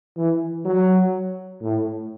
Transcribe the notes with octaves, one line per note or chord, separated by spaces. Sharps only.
E3
F#3
A2